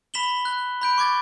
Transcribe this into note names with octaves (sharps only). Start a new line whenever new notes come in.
B5 B6 E7 F#7 G7
F#6
B5 G6 D7
C#6 D6 G#6 A6